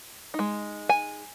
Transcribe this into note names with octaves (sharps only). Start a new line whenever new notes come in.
D#4
G#3
G#5